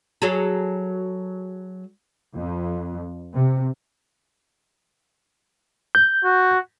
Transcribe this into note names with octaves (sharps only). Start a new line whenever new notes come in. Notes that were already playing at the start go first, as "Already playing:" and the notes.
F#3 G#4 A4
F2
C3
G6
F#4